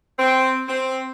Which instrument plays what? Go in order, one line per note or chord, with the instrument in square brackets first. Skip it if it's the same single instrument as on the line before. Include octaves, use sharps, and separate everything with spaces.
[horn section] C4
C4